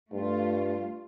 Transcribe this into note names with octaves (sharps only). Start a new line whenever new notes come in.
G2 A3 F4